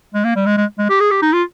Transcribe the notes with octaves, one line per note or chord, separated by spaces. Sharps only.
G#3
A#3
G3
G#3
G#3
G#3
G4
G#4
G4
D#4
F4